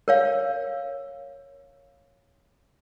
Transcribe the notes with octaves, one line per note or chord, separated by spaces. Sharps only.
A#4 C#5 F5